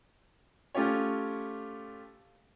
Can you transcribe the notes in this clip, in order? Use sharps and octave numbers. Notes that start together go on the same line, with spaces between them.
A3 C#4 F4 G4 C#5